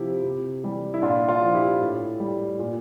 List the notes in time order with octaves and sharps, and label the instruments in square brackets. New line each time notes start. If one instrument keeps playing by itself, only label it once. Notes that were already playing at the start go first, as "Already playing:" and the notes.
Already playing: [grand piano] C3 F3 E4 G4
C3
E3 G3
E4
A#2 D4 F4
D4 F4
F3
E4 G4
A2
G3
A#2